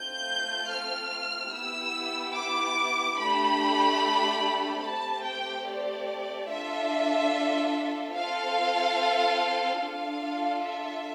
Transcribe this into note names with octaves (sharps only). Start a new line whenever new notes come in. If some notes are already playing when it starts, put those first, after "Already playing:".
Already playing: A3 C4 F4 G6
F6
B3 E4 G4 E6
D6
A3 D4 G4 B5
A3 C4 G4 A5
G5
D5
D4 F4 A4 E5
C4 F4 A4 F5
D4 F4 A4 F5
E5